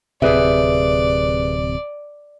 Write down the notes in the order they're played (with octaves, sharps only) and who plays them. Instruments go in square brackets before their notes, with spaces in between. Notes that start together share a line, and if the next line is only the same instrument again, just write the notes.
[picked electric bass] D1 C3 [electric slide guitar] G#4 B4 E5 [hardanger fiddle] D5